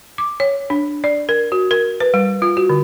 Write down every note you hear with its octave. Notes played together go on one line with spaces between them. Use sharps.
D6
C#5
D4
D5
A#4
F#4
A#4
B4
G3
F4
F#4
D3